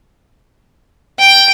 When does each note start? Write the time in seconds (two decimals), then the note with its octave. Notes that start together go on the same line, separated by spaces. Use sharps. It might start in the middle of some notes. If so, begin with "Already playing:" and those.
1.19 G5